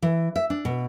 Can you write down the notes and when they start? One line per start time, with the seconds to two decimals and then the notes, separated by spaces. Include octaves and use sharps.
0.02 E3
0.36 E5
0.50 D4
0.65 B2